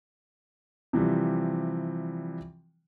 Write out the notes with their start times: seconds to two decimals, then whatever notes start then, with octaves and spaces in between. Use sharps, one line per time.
0.93 C3 E3 F3 G3